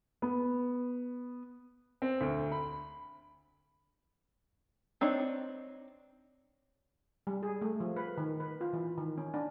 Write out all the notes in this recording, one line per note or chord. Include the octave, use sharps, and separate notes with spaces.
B3
C4
D2
B5
C4 D4 D#4 C#5
G3
G#4
A3
F3
B4
D#3
B4
F4
E3
D#3
C#4
D4